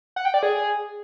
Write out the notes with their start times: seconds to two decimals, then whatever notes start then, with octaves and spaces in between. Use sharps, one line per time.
0.16 F#5
0.25 G5
0.34 D5
0.43 G#4